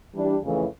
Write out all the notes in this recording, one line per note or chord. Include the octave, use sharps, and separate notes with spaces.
E3 G3 D4 G4
F2 C#3 E3 A3